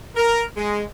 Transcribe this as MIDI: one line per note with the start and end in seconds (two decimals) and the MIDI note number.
0.15 0.44 70
0.56 0.82 56